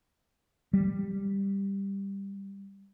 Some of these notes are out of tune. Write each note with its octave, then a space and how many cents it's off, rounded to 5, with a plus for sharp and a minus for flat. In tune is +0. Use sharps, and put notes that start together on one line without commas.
G3 +10